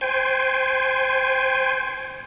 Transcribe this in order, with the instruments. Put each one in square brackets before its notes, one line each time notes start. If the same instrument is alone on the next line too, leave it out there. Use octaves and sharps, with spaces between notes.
[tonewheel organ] C5 G5 G#5